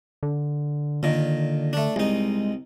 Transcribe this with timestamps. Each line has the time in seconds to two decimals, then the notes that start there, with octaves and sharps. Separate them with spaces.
0.23 D3
1.03 A#2 D3 D#3
1.73 A3 D4
1.96 C2 G#3 D#4